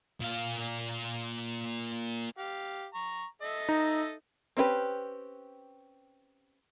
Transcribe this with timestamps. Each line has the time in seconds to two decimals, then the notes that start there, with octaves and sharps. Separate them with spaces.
0.21 A#2 F5
2.38 G4 F5
2.94 A#5 C#6
3.42 A4 D#5 E5
3.69 D#4
4.57 C4 C#4 E4 G4 B4